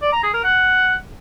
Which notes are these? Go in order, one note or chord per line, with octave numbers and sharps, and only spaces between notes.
D5
A#5
G#4
A#4
F#5